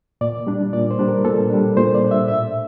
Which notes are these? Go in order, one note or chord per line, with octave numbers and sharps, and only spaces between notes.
A#2 D5
G3 D4
A#2 D5
C5
G3 D4
A#4
A#2 A4
G3 D4
A#2 C5
D5
G3 D4
E5
A2 E5